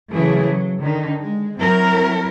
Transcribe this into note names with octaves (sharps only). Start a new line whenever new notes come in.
C#3 E3 F#3 A3 E4 G#4
F#3
D3 D#3 D#4
G#3
F#3 C4 E4 A#4